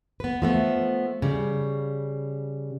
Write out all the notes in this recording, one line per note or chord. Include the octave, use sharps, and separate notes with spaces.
B3 B4
F3 A3 B3
C#3 G3